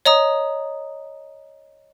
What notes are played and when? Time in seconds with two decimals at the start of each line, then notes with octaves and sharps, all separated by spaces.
0.06 C#5 D#5 A#5 D#6